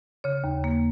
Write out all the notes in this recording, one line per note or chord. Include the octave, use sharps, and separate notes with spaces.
C#3 C#5
D#2
A#3